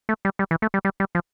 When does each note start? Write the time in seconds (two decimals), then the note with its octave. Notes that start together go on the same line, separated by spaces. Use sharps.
0.09 A3
0.25 G3
0.39 G3
0.51 E3
0.62 A3
0.74 G3
0.85 G3
1.00 G3
1.15 F3